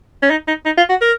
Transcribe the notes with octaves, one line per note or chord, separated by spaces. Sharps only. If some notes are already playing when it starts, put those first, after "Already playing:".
C#4
D#4
D#4
D#4
F4
F#4
A#4